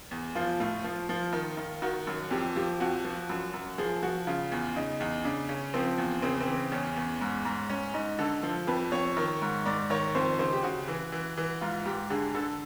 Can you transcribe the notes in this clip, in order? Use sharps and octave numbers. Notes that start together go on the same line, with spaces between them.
E2
F3 F4
A2 F4
F3
F3
D#3
D#3
D#3 F#4
F#2
F2 G4
F3 G4
F2 F#4
F3
F#2
F#2
F3 G#4
F3 F#4
C#3 F4
E2
C#3 D#4
E2
C#3 D4
C#3 C#4
F3 C4
E2
C#3 C4
C4
E3
E2 C#4
E2
G#2
G#2
G#2 C#4
G#2 D#4
D3 A4
F3
F2 B4
F2 C#5
D#3
G#2
G#2 D5
D#3 C#5
F2 C5
C#3 C5
G4
C#3 F#4
E3
E3
E3
G#2 F4
G#2 G4
D3 G#4
D3 A4